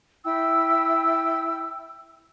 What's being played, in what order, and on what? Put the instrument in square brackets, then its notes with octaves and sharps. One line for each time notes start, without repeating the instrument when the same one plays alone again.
[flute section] E4 G5 E6